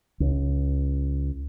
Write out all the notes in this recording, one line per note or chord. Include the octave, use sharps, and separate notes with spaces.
C#2